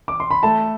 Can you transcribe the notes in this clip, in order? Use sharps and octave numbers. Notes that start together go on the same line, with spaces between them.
D6
C6
B5
A3 A5